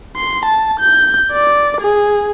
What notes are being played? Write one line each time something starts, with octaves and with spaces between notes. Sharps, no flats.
C6
A5
G6
D5
G#4